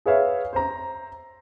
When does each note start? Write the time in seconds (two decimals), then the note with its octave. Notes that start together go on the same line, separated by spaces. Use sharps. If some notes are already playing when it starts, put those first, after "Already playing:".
0.06 G#4 B4 C#5 E5 F5
0.53 C5 A#5